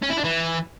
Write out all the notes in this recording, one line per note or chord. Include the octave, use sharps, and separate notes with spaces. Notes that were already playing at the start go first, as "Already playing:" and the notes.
C#4
E4
D4
E3